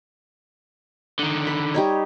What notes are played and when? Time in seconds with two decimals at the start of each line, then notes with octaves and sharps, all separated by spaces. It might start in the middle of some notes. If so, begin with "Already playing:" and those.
1.19 D3 D#3
1.47 B5
1.74 G3 D#4 C#5